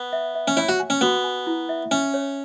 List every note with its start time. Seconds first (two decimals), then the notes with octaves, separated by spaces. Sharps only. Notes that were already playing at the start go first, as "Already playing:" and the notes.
Already playing: B3
0.13 E5
0.35 E5
0.48 C#4
0.57 E4 C#5
0.69 F#4
0.80 G#5
0.90 C#4
1.01 B3 F#4
1.24 G#5
1.47 E4
1.69 E5
1.91 C#4 E5
2.14 C#5